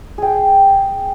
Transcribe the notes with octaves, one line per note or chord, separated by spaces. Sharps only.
G#4 G5